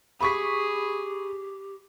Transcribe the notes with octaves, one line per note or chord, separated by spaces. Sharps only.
G4 G#4 B5 C#6 B6